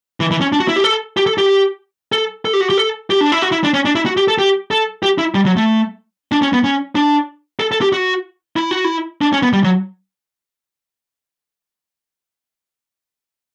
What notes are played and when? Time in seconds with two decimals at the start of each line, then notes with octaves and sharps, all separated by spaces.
0.20 E3
0.31 E3
0.41 C#4
0.52 D4
0.60 F#4
0.68 E4
0.76 G4
0.84 A4
1.17 G4
1.26 A4
1.38 G4
2.12 A4
2.45 A4
2.53 G4
2.61 F#4
2.70 G4
2.77 A4
3.10 G4
3.21 D4
3.32 E4
3.42 F#4
3.52 E4
3.64 D4
3.73 C#4
3.85 D4
3.95 E4
4.06 F#4
4.17 G4
4.28 A4
4.39 G4
4.71 A4
5.03 G4
5.18 E4
5.35 G3
5.46 F#3
5.56 A3
6.32 D4
6.42 C#4
6.53 B3
6.64 C#4
6.95 D4
7.60 A4
7.72 A4
7.81 G4
7.92 F#4
8.56 E4
8.71 F#4
8.84 E4
9.21 D4
9.33 C#4
9.42 B3
9.53 G3
9.64 F#3